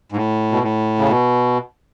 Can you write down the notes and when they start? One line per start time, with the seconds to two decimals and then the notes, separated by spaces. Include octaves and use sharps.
0.12 G#2
0.16 A2
0.52 B2
0.63 A2
0.99 C#3
1.09 B2